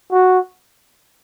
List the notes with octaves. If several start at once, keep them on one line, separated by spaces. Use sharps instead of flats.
F#4